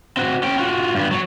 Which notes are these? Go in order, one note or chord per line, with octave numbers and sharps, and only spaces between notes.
C4 F#4
C#4 G5
F4 F#4
G2 B3
F#3 C#5